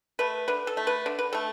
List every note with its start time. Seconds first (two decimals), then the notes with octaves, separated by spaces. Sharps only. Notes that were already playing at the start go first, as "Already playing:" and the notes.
0.19 A3 B4
0.48 D3 B4
0.67 A4
0.77 A3
0.87 B4
1.06 D3
1.19 B4
1.33 A3 A4